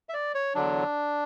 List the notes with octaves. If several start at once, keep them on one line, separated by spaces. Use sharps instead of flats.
E5
D5
C#5
E2 D3 F#3 D4